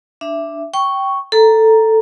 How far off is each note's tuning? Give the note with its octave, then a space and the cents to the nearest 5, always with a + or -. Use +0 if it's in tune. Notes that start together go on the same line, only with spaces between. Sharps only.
D4 +0 E5 +10
G5 -10 C#6 +0
A4 +5 A#5 +0